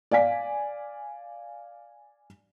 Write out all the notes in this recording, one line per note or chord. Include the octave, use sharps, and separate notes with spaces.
D5 F5 G#5 B6